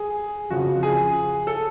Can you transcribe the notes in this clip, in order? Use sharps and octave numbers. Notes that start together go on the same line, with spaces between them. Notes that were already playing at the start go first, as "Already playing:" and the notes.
Already playing: G#4
F2 C#3 F3 F#4
G#4
A4